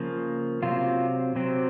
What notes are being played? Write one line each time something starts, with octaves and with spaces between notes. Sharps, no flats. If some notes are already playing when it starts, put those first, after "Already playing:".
Already playing: C#3 F3 A#3
C3 F#3 C4 F4
C3 F#3 C4